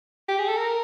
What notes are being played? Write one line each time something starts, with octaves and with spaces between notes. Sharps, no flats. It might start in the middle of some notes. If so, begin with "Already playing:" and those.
G4
G#4
A4
A#4